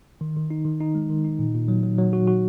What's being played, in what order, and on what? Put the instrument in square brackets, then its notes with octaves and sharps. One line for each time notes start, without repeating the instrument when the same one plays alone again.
[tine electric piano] D#3
D#3
D#4
D#3
D#4
G#3
D#3
D#4
A#2
A#2
F#3
F#3
F#3
F#4
F#4